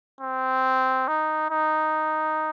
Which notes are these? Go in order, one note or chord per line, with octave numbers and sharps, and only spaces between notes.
C4
D#4
D#4